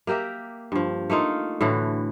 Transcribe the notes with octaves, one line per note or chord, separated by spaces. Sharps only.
A#3 G4 A#4 E5
G2 F3
A3 A#3 D#4 F4
A2 D3 E3 F#4